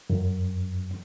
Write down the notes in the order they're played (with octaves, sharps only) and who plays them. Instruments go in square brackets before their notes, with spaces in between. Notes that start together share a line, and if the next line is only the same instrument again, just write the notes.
[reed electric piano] F#2